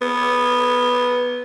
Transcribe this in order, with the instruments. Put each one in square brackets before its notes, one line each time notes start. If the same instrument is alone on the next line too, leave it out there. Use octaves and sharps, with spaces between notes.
[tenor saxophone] B3